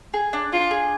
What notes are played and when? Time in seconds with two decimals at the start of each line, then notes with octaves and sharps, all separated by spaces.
0.14 G#4
0.33 D4
0.52 D4 F4
0.71 G#4